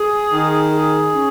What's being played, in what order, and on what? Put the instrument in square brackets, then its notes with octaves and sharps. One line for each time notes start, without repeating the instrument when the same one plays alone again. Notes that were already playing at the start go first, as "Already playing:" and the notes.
Already playing: [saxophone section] G#4
D#3
G#4
C#4